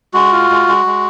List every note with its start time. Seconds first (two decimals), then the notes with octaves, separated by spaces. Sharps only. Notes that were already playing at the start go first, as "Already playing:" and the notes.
0.14 G#3 F#4
0.32 F4
0.50 G#3
0.68 G#3
0.86 G#3